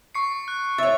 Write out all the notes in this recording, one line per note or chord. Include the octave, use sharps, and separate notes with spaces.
C#6 C7 C#7
F#6
C#5 E5 A6